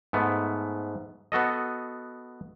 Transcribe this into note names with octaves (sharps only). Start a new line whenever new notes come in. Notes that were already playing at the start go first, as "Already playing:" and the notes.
G#2 A3 B3
B3 F#4 A4 D#5